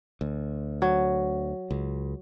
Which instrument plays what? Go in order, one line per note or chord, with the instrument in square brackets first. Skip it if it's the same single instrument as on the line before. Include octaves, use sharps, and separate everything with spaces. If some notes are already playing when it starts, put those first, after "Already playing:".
[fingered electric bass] D2
[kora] F#3
[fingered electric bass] C#2